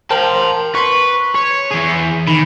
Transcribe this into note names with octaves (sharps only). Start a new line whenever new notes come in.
A#4 C5 G5 A5 C6
B4 C6 C#6
C#5
E3 G#4
D#3 B5